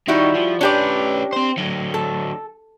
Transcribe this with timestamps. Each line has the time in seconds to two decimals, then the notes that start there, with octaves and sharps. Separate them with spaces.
0.08 D#3 G3 E4 F#4
0.35 F3
0.61 C#4 D4 G4 B4 D5
1.33 C4 C5
1.58 D3 F#3
1.94 A4